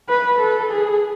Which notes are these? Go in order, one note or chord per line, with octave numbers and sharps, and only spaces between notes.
B4
A4
G#4